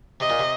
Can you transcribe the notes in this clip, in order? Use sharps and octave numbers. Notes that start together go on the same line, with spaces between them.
C3 D#5
A#2
C3